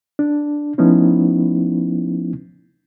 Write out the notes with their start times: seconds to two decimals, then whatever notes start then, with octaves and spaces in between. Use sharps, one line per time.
0.19 D4
0.78 F3 A3 B3 C#4 D#4 E4